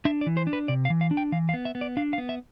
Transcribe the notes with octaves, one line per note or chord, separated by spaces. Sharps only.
D4 E5
D5
E3
C5
D4
B4
C3 D5
F5
E3
F5
D4
G5
E3 F5
F5
B3
E5
B3
D5
D4 F5
F5
B3
E5